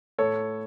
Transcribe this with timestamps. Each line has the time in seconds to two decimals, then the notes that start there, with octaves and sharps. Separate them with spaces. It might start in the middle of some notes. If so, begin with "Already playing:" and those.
0.18 A2 A4 C#5